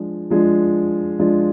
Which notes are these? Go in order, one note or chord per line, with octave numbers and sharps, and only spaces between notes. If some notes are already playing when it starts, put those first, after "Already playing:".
Already playing: F3 G#3 D4 F4
F3 G#3 D4 F4
F3 G#3 D4 F4